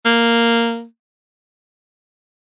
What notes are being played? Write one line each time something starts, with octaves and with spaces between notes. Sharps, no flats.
A#3